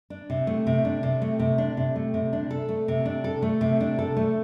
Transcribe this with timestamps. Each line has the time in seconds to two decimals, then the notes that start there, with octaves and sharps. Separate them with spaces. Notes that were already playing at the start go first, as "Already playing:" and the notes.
0.10 D4
0.30 C3
0.47 A3
0.67 C3
0.85 D4
1.03 C3
1.22 A3
1.39 C3
1.58 D4
1.77 C3
1.96 A3
2.14 C3
2.33 D4
2.51 A4
2.69 A3
2.88 C3
3.05 D4
3.24 A4
3.42 A3
3.61 C3
3.80 D4
3.99 A4
4.17 A3